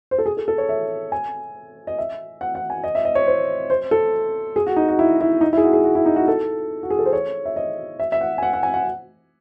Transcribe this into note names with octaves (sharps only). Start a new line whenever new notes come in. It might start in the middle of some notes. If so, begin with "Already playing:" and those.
C5
A4
G#4
A4
A4
C#5
E5
G#5
D#5
E5
F#5
F#5
G#5
D#5
E5
D#5
C#5
C5
C5
A4
G#4
F#4
D#4
F#4
E4
E4
D#4
E4
G#4
F#4
G#4
F#4
E4
D#4
F#4
A4
F#4
G#4
A4
C5
C#5
E5
D#5
E5
E5
F#5
G#5
F#5
F#5
G#5
F#5